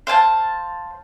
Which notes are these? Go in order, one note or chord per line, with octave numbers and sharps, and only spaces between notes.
C5 F5 G#5 A5